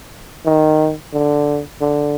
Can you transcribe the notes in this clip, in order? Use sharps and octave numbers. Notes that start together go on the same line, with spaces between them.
D#3
D3
D3